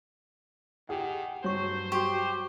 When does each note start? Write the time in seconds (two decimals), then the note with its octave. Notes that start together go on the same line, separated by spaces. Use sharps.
0.89 D#3 G4 G#4 F#5
1.44 G2 F#3 C5 C#5 C#6
1.92 F#4 G4 C#6